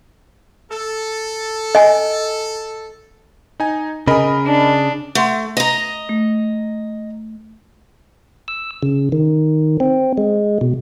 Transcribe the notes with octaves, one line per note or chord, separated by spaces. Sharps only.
A4
D#5 G#5
D#4 G#5
C#3 G#4 A#4 D#5 B5
D4
A3 F#5 C6
D#5 A#5
A3
E6
C#3
D#3
C4
G#3
B2